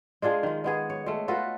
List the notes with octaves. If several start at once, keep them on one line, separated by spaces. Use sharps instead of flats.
G#3 D4 F4 G#4
D#3 G#3
G#3 B3 G#4
C#5
G#3 A3
F4 F#4 A4 B4